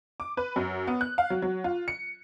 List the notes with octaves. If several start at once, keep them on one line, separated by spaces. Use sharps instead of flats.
D6
B4
F#2
B3
F#6
F5
F#3
F#3
F4
C#7